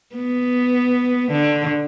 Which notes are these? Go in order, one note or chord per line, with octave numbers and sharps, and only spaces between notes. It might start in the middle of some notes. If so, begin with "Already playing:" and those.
B3
D3